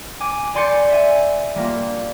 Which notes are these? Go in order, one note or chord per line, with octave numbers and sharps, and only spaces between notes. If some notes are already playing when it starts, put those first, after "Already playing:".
G#5 D6
D5 G#5 C6 G6 A6 C#7
E5 G#5
G3 A#3 F4